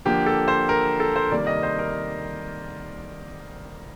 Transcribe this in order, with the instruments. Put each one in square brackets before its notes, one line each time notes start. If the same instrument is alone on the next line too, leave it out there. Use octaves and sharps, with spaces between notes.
[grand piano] D3 F3 A#3 G4
A4
C5
A#4
A4
C5
C3 D#3 G3 A#3 D5
D#5
C5
A#4